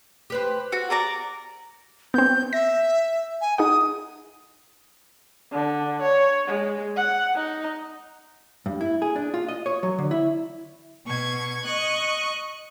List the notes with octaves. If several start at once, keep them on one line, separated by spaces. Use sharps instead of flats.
G4 B4 C5
F#4
A#4 D5 A#5
B3 C4 G6
E5 A#6
G#5
D#4 G#4 F#5 D#6
D3
C#5
G#3
F#5
D#4
G2
E4
G#4
D4
F4
D#5
C#5
F#3
D3
E4
B2 C#6 G#6
D#5 C#6 F#6